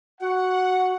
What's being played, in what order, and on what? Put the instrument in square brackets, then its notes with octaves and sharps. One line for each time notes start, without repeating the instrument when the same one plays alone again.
[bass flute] F#4 [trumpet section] F#5